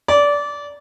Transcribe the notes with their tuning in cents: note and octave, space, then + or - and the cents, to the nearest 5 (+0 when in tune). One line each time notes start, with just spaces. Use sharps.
D5 -20